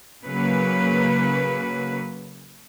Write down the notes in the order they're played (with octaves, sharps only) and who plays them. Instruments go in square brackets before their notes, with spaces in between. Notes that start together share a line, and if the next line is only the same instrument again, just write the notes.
[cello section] C#3 F#3 A#3 B4